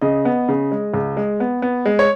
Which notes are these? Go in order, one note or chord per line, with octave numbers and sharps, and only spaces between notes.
C#3 D#5
B3
C#3
G#3
C#2
G#3
B3
B3
G#3
C#5